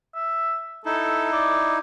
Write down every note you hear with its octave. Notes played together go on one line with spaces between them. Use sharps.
E5
D#4 E4 A4
D5